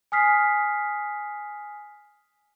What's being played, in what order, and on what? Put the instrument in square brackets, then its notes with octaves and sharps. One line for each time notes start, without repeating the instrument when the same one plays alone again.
[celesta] G#5 D#6 F6 B6 C7